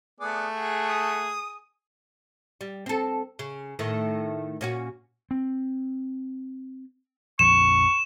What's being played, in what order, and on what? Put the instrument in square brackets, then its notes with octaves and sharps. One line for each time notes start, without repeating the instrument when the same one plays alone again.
[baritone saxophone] A3 [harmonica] B3 G#4 D5
[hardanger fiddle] G#4 [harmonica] F#5
[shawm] D#6
[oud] G3
C4 A4
C#3
A2 D#3 A3
A#2 C#4 F#4
[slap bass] C4
[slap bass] A#1 F2 D3 [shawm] C#6 [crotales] E7